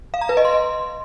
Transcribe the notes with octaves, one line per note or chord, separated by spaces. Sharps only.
F5
A#5
B4
D#5
C6